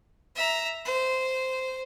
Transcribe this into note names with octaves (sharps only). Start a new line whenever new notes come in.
E5 A#5
C5